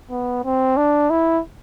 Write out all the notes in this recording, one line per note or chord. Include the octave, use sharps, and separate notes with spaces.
B3
C4
D4
E4